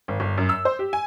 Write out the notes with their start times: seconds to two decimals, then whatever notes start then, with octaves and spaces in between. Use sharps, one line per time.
0.08 G#1
0.20 G1
0.38 F#2
0.49 E6
0.65 C5
0.79 G4
0.93 G#5